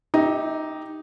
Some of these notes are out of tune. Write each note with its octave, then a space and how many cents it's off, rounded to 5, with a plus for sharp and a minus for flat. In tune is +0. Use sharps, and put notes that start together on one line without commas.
D#4 +0 G4 +0 E5 -35